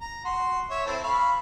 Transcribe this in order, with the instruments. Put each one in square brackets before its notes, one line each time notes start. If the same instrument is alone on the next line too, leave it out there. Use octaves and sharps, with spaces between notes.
[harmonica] A#5
F#4 C6
C#5 E5
C4 E4 A4
F5 B5 C#6